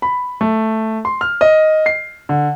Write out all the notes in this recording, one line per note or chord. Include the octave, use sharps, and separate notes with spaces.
B5
A3
C6
F6
D#5
C7
D3